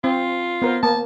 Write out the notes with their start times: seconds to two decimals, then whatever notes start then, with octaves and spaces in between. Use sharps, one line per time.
0.04 C4 F4
0.62 B3 A#4 C5
0.83 A#3 A5